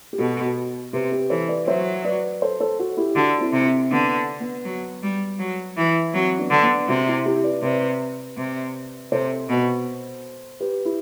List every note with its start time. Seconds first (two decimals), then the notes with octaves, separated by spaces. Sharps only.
0.13 G4
0.18 B2 F#4 A4
0.93 C3 G4 B4
1.11 G4 B4
1.30 E3 A4 C5
1.48 B4 D5
1.67 F#3 C5 E5
2.05 B4 D5
2.42 A4 C5
2.60 A4 C5
2.79 F#4 A4
2.97 E4 G4
3.16 D3 D4 F#4
3.40 C4 E4
3.53 C3
3.65 C4 E4
3.91 D3 B3 D4
4.40 B3
4.65 F#3
5.03 G3
5.39 F#3
5.77 E3
6.14 F#3 C4
6.39 B3 D4
6.51 D3
6.63 B3 D4
6.88 C3 D4 F#4
7.07 C4 E4
7.26 E4 G4
7.44 B4 D5
7.63 C3 B4 D5
8.37 C3
9.12 C3 A4 C5
9.49 B2
10.60 G4 B4
10.85 E4 G4